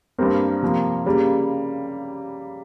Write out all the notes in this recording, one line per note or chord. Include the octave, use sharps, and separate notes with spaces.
G2 G3 A#3 C4 A#4
C3 F3 A#3
C#3 G3 A#3